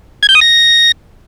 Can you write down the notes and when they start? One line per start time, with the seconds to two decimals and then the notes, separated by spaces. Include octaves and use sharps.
0.23 G#6
0.29 G6
0.35 D#6
0.41 A#6